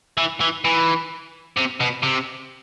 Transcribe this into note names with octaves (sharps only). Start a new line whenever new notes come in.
E3
E3
E3
C3
B2
C3